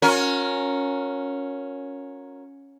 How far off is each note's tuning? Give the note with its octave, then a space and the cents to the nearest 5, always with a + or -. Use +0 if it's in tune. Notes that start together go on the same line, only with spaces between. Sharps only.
C#4 +0 F#4 -40 A#4 +0